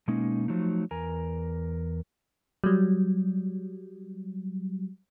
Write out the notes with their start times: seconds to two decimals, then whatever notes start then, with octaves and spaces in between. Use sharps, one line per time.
0.08 B2 G#3 A#3 C#4 D#4
0.48 F3 F#3 A3 D#4
0.91 E2 A#4 G#5 A#5
2.64 F#3 G3